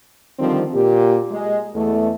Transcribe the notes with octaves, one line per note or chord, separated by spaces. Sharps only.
D3 D#3 F3 G3 C4
A#2 G4
G#3
E2 A3